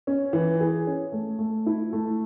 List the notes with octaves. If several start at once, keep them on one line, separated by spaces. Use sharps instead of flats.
C#4
E3
G#4
C#4
A3
A3
E4
A3